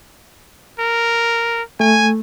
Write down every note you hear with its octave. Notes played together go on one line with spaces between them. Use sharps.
A#4
A3 G#5